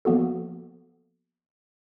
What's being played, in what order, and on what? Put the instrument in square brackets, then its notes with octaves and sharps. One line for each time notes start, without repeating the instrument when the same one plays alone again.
[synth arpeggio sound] F3 A#3 B3 F#4 A4